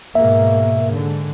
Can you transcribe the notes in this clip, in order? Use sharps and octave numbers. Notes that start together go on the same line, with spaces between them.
G#2 B2 A#3 E5
G#2 D3